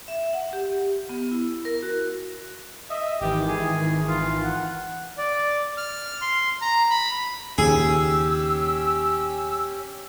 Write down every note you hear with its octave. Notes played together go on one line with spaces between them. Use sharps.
E5
F#5
G4
B3
E4
A#4
F#4
D#5 E5
G#1 D#3 E3 G4
G#4
F4
F#5
D5
F6
C6
A#5
B5
D#2 A#2 C#3 C#4 G4 G#4 E6